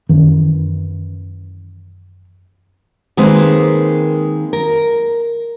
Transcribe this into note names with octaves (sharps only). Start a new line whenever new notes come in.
F#2 D#3 E3
D#3 G#3 A#3 C4 B4
A#4